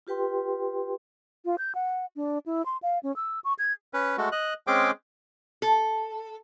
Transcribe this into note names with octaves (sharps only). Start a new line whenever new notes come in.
F4 G4 B4 G5 C6
F4
G6
F#5
D4
E4
C6
F5
C#4
E6
C#6
G#6
C#4 B4
G#3 A3 F#4
D#5 F#6
G#3 C4 C#4 G#4 G5 D6
A4